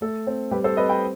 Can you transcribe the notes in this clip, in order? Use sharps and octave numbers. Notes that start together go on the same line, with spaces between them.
A3 A4
C4
G3 G4 B4
A4 C5
C4 B4 D#5
G5 B5